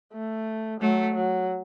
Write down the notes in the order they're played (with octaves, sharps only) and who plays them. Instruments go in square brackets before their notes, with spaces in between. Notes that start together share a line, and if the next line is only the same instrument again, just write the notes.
[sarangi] A3
[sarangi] F#3 [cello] A3
[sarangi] F#3